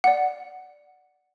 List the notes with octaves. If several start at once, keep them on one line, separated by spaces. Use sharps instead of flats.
D5 F#5